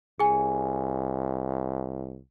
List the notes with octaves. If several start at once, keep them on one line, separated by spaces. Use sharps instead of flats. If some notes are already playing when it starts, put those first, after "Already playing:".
C2 G#4 G#5